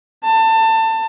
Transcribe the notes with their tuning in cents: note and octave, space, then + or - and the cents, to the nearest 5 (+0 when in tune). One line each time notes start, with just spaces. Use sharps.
A5 +25